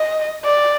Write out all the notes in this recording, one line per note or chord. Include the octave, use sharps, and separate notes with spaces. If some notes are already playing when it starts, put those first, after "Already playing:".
Already playing: D#5
D5